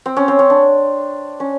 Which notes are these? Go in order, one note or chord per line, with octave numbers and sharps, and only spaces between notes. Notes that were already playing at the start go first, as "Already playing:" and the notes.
C4
C#4
C4
C#4
D4
C#4